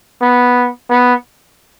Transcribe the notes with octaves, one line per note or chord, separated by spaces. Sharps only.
B3
B3